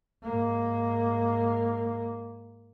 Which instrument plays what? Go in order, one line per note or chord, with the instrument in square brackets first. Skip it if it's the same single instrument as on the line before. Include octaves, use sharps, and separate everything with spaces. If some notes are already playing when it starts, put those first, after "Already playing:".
[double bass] G#2 A#3